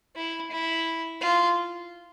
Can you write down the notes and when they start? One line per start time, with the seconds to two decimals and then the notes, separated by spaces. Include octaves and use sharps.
0.16 E4
0.51 E4
1.21 F4